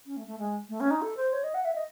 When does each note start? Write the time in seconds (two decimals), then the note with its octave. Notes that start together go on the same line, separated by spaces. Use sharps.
0.06 C#4
0.17 A3
0.27 A3
0.39 G#3
0.69 A3
0.80 C#4
0.91 D#4
1.02 A4
1.17 C5
1.33 C#5
1.44 D#5
1.54 F#5
1.65 E5
1.75 D#5